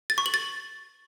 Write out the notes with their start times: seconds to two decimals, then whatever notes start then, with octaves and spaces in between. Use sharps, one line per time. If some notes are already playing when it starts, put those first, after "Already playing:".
0.10 A6
0.18 C#6
0.26 F#7
0.34 A6